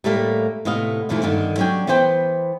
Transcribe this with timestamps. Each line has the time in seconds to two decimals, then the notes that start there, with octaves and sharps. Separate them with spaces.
0.04 A2 G3 A3 A#3
0.65 A2 C3 B3 D#5 F5
1.09 D#2 A#2 E3 F3 A3
1.23 G2 D3 D#3
1.58 F#3 C#4 D4 G5
1.87 E3 B3 B4 C5 G5